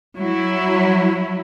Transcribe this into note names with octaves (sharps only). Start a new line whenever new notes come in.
F#3 E4